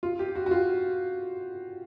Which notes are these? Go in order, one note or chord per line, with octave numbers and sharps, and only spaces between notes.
F4
G4
F#4
F#4
F4